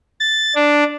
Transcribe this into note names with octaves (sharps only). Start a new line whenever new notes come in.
A6
D4